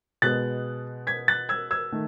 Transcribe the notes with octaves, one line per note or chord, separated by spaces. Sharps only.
B2 G#3 B3 F#6 A6
G#6 B6
F#6 A6
E6 G#6
E6 G#6
D#3 A3